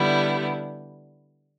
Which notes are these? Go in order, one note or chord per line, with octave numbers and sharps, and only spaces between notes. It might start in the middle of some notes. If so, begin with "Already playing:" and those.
Already playing: D3 G3 B3 E4